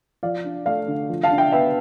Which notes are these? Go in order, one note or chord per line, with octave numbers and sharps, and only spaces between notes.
F3 D5 F5
D4
A3 D5 F5
D3
F3
F5 A5
D4
E5 G5
B3 E5 G5